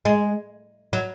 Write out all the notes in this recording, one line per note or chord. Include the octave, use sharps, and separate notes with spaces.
G#3
F#3